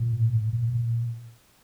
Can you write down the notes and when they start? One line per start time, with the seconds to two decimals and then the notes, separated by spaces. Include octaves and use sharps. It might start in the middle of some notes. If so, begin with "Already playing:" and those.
Already playing: A#2
0.13 A2
0.33 A2
0.53 A#2
0.73 A#2